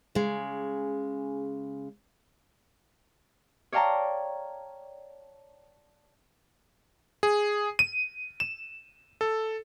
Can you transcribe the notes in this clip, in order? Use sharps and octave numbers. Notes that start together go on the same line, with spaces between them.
C#3 G#3
C#5 D5 F5 G5 A5 A#5
G#4
D#7
E7
A4